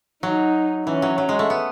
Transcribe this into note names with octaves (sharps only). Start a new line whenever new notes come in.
F#3 D#4
E3 C#4
F#3
F#3
G#3
A3
B3